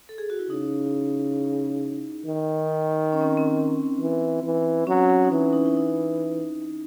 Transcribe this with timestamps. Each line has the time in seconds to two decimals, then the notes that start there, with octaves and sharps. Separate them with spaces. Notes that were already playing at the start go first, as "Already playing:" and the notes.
0.09 A4
0.18 G#4
0.30 F#4
0.39 E4
0.50 C#3 D#4
2.25 D#3
3.13 C#4
3.21 C4
3.37 C4
4.00 E3
4.43 E3
4.87 F#3 C#4
5.09 C#4
5.24 D#4
5.31 E3 C#4
5.53 D#4
5.66 E4
5.77 D#4